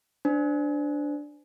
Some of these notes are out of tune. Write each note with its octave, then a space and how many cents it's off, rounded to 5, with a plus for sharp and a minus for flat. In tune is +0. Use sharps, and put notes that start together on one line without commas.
D4 +0 C5 -25